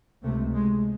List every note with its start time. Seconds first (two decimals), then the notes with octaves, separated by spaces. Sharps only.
0.23 C#2 C3 A3
0.53 G#3